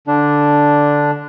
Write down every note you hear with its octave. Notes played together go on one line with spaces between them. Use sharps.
D3 D4